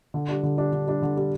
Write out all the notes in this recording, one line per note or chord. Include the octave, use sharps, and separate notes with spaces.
D3
G3 D4
D3
G3 D4
D3
G3 D4
D3
G3 D4